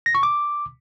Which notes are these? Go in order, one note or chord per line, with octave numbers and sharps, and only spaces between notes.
A#6
C#6
D6